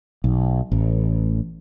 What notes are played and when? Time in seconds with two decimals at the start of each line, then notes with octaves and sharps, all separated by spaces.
0.24 B1
0.72 A1